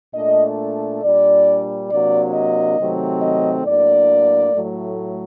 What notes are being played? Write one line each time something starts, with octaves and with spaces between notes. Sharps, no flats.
A#2 A3 D4 D#5
A#2 G3 D4 D5
C3 F#3 A#3 D4 D5
D#5
C3 D#3 F#3 A3 C4
D#5
A2 F#3 A#3 D4 D5
A2 F#3 A3